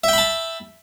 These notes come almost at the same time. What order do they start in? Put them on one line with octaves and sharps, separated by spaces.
E5 G5 B5 A5